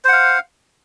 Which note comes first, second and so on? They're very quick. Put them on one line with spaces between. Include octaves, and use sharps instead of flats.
C5 F#5 F5